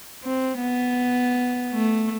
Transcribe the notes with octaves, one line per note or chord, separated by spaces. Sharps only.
C4
B3
A3